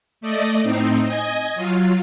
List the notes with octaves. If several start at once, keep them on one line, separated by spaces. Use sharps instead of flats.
A3 D5 D#5
A2 C4 D#4
D#5 G#5
F#3 F4